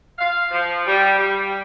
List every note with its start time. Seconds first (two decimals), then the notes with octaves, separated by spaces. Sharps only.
0.19 F5
0.51 F3
0.86 G3
1.18 G3